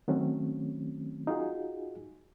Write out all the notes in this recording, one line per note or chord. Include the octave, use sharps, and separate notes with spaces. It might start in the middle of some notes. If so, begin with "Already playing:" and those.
D#3 F#3 A3 C4 C#4
D#4 F4 F#4 G#4